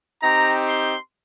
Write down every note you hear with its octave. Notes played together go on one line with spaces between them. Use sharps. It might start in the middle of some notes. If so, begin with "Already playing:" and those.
C4 D#4 G4 A#5
C6